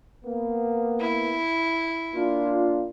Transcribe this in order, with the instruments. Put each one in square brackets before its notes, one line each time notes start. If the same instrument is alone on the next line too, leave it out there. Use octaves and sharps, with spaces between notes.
[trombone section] A#3 B3
[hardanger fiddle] E4
[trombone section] A#3 D4 F4